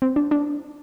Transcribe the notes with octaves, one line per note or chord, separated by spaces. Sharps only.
C4
D4
D4